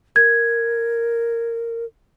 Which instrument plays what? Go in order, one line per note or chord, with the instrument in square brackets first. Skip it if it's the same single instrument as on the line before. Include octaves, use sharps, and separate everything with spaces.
[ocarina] A#4 [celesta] G#6